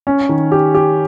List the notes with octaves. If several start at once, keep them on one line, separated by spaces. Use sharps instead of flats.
C#4
D#3
G4
G4